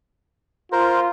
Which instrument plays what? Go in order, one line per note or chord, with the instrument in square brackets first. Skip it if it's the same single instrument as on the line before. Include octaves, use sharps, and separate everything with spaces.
[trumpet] F4 [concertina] A#4 C5